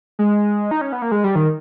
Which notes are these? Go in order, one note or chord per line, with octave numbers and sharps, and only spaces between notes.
G#3
D#4
C#4
B3
A#3
G#3
G3
D#3